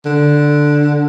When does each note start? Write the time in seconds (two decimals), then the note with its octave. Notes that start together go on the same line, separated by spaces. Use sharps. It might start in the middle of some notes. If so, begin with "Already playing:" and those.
0.06 D3